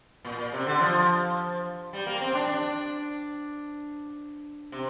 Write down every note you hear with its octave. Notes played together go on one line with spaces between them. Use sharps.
A#2
A#2
C3
D3
F3
G3
A#3
C4
D4
D4
C3